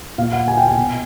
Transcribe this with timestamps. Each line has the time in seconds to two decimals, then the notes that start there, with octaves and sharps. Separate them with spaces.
0.18 A#2 F5
0.33 F#5
0.48 G#5
0.57 G5
0.68 G#5
0.77 B2